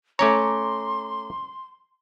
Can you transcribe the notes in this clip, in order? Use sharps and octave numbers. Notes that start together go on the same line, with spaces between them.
A3 C#4 C#5 A#5 C6 D6